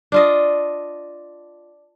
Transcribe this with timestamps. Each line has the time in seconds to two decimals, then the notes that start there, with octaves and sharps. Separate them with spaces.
0.12 D4 F4 D#5